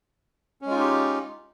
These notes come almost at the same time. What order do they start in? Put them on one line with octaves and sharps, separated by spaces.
C#4 G#3 F4 D#4 G4